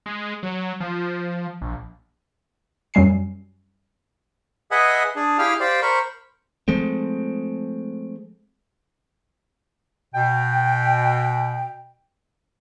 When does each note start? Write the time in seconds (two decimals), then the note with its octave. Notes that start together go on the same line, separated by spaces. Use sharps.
0.06 G#3
0.43 F#3
0.80 F3
1.61 A#1
2.94 F#2 F#3 G3 G#5 C7
4.71 G#4 B4 D#5 E5 F#5 G#5
5.16 D4 G#4
5.39 E4 G4 G#4 F5 G5 F6
5.60 G4 C5 D5 F5 G5
5.82 A#4 C5 B5 C#6
6.68 F3 G#3 A3 C4
10.14 B2 G5